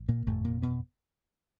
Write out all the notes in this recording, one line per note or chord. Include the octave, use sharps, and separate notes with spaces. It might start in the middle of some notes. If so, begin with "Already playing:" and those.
Already playing: A1
A#2 A#3
G1 F2 A2 C3 A3
A#2 A#3
B2 B3